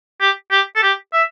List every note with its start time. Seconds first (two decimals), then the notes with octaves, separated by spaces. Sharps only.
0.21 G4
0.51 G4
0.76 A4
0.83 G4
1.13 E5